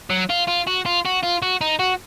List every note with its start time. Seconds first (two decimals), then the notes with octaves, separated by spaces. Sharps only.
0.10 F#3
0.30 F4
0.48 F4
0.67 F#4
0.86 F4
1.05 F#4
1.23 F4
1.42 F#4
1.61 D#4
1.80 F#4